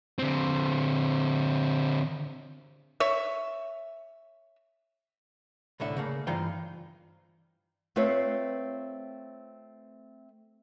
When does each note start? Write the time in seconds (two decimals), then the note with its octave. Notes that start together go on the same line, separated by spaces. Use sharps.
0.18 D3 C4
3.00 C#5 E5
5.80 C2 A2 D3 E5
5.97 C#3 A3 A#3
6.27 G2 E3 D#4 F4 C5 G5
7.96 A3 C4 F4 B4 C#5